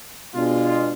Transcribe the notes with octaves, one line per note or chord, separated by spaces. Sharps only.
B2 G#3 D4 F4